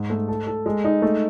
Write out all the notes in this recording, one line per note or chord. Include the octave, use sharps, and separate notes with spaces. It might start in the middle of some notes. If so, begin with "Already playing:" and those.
Already playing: G#2
A3
A4
A4
G#3
D#4
A3